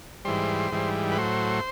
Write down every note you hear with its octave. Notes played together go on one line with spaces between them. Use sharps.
G#2 E3 G3 C5
G#2 E3 G3
B4
A2 F#3 C5